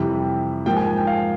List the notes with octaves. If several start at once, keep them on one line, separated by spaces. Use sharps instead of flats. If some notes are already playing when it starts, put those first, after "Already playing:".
Already playing: F2 C3 E3 G3
G#2 F3 A#3 G5
G#5
G#5
G5
F5